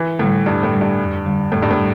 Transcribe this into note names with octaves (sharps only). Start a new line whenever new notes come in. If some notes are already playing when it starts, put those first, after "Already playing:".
Already playing: E3
A2 D3 G3
E2 G2
A2
D3 G3
G2
F2
D3 G3
F2 A2
G2
A2
G3